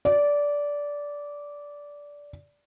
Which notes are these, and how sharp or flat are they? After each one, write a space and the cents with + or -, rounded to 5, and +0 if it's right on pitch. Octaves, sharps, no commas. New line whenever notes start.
D5 -15